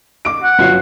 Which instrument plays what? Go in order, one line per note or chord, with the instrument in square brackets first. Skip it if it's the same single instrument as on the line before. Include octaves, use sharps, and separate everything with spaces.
[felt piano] D6 D7
[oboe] F#5
[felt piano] G1 F#3 C7